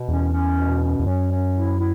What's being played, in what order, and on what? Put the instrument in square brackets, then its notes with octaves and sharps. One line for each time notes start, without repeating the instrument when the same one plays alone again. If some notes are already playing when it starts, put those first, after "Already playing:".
Already playing: [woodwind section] B2
[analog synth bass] E2 [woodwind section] C#4
[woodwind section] C#4
B2
C#4
[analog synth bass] E2
[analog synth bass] F#2 [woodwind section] C#4
[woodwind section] C#4
E4
E4